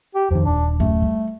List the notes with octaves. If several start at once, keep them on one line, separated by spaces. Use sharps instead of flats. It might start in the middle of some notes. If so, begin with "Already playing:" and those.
G4
F2 D#3 F3
D#1 D4
F#2 A3
G3